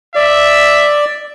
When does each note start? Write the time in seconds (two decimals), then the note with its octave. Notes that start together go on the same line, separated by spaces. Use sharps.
0.15 D5 E5